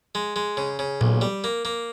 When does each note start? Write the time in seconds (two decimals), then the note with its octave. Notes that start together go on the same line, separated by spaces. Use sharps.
0.15 G#3
0.36 G#3
0.57 C#3
0.79 C#3
1.01 B1 A#2
1.21 G3
1.44 A#3
1.65 A#3